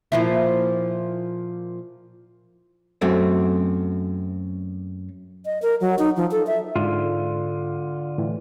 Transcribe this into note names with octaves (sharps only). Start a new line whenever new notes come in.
A#2 F3 E4
F#2 A3 C4
D#5
A#4
F#3
D#4
F3
A4
E5
G#2 D3 F4
A2 E3